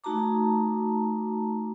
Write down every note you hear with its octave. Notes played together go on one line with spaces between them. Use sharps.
A3 D#4 F#4 A5 A#5 D6